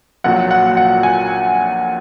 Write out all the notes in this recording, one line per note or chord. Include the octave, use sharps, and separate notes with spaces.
A#1 A#2 F#3 F#5
F#5
F#5
G#5